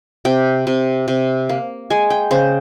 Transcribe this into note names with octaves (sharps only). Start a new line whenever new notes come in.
C3 G5
C3
C3
A#3
G#3 G#5
G5
C#3 C5